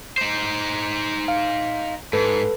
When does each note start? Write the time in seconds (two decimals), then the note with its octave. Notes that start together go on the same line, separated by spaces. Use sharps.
0.18 D#4 C5
1.28 F5
2.13 G#2 A4 B4